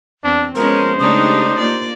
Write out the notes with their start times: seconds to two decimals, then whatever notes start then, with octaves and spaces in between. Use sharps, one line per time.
0.24 E2 C4 D4
0.55 F3 G#3 B3 C#4 A#4 C5
1.00 C#3 G#3 A3 D4 D#4 G4 D#6
1.58 A#3 F4 D5